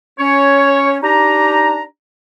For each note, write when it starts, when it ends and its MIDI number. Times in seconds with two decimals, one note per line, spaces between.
0.19 0.98 61
0.19 0.98 73
1.03 1.83 62
1.03 1.83 63
1.03 1.83 67
1.03 1.83 82